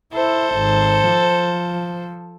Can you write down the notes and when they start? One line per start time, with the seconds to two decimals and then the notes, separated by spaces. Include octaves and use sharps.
0.13 E4 A4 C5
0.55 G#1
1.07 F3